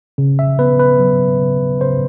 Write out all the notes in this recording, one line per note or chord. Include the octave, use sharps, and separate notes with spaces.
C#3
E5
B3 B4
B4
F#3
C#3
C#3 C5